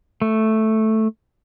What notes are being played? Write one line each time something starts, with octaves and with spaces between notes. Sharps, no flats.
A3